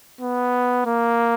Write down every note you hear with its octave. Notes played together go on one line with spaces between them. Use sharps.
B3
A#3